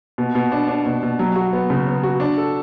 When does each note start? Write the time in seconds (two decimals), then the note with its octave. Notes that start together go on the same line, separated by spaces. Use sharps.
0.18 B2
0.35 B2
0.52 D4
0.68 D4
0.86 B2
1.03 B2
1.19 F#3
1.36 F#4
1.53 B3
1.70 C#3
1.87 B3
2.03 F#4
2.20 D4
2.38 A4